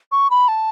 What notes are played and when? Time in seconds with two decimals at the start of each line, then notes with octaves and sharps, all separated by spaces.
0.12 C#6
0.30 B5
0.48 A5